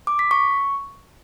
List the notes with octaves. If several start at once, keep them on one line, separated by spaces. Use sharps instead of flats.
D6
B6
C#6